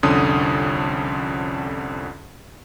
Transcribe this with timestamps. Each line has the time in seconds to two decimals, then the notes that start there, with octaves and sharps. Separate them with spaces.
0.03 C2 F2 D3 C#4 D#6